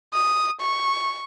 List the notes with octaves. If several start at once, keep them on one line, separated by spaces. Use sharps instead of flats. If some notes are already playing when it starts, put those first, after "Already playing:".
D#6
C#6